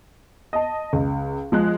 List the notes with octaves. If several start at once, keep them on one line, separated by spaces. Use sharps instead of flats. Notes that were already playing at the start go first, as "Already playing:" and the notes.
D#5 A5
C#2
F3 G#3 F#6